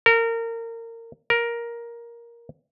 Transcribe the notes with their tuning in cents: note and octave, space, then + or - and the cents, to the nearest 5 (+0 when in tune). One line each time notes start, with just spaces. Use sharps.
A#4 -25
A#4 +10